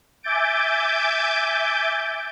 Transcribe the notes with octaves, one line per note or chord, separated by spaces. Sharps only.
E5 G#5 D6 G6 A6 D7